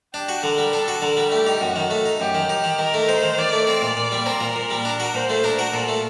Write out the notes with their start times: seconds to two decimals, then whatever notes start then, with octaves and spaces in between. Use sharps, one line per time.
0.14 D4 G4
0.29 F#4
0.43 D3 A#4
0.58 G3
0.73 D4 A4
0.88 F#4
1.02 D3 A#4
1.17 G3
1.32 A3 G4
1.47 D#4
1.61 F#2 F#4
1.76 D#3
1.90 A3
2.06 D#4
2.20 F#2 G4
2.35 D#3
2.49 D#4 G4
2.64 D#3
2.79 D#3 A#4
2.94 A3
3.08 D#4 C5
3.23 D#3
3.38 D#3 D5
3.53 A3
3.67 C4 D5
3.82 A#2
3.97 A#2
4.12 G3
4.26 C4 A#4
4.41 A#2
4.56 A#2
4.71 G3
4.85 D4
5.00 F#4
5.14 A#2 C5
5.30 A3
5.44 D4 A#4
5.59 F#4
5.74 A#2 A4
5.88 A3